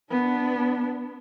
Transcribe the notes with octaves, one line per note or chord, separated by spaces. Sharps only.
B3 D4